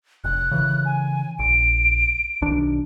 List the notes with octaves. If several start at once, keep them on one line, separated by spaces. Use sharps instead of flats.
F1 F#6
C#3 E3
G#5
A#1 D7
B1 D#3 D4